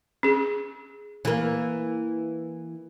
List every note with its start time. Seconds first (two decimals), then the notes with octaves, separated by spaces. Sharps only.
0.23 C#4 G#4
1.25 E3 A#3